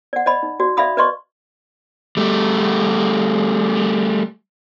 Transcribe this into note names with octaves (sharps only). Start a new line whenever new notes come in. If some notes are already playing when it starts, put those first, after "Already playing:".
D5 F#5
D5 D#5 B5
D#4
F#4 D5
D5 E5 F5 B5 D#6
B4 D5 D#5 C6 C#6
G3 A3